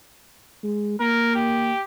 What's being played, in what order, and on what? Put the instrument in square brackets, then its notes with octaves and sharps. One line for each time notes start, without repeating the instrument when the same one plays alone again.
[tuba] G#3
[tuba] A#3 [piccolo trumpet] A#4
[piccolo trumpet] G4